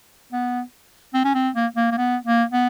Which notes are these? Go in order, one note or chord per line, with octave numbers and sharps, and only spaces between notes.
B3
C4
C#4
C4
A#3
A#3
A#3
B3
A#3
B3